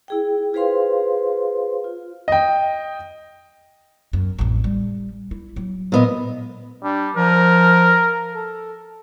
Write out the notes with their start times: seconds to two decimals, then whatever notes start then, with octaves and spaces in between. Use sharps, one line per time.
0.08 E4 G#4 G5
0.53 F4 G#4 B4 C5 F5 C6
1.84 F4
2.28 D#5 G5
4.13 F#2
4.39 A1 F2
4.64 G3
5.31 E4
5.56 F#3
5.92 A#2 B3 D#5
6.83 G3 D4
7.16 F3 A#4
8.34 A4